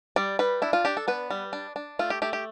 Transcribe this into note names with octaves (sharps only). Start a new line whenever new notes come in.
G3 D5
G3 B4
D4 E4
F4
D4 G4
A4
B3 B4
G3
D4
D4
A3 F4
G4
A3 G4
G4